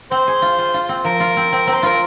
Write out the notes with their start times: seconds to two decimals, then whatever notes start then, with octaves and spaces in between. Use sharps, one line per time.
0.11 C4 C5
0.28 G#4
0.42 F4
0.58 F4
0.74 F4
0.89 C4
1.04 F3 A#4
1.20 F4
1.37 C4
1.52 C4
1.67 C4
1.74 C5
1.83 F4 A#4